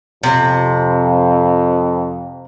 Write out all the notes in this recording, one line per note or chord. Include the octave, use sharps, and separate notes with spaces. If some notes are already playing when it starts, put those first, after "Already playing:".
F2 C3